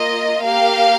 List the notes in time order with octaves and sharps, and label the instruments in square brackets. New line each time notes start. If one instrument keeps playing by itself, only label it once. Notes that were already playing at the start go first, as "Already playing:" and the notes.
Already playing: [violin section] A#3 F4 D#5
A#3 G4 F5